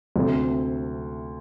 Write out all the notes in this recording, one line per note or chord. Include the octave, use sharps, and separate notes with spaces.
D2 C3 A3 C4